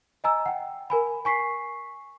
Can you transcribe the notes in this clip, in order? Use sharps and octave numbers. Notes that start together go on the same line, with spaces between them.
D#5 G#5 A#5 E6
F#5 G5
A#4 G#5 B5
G#5 C#6 B6 C7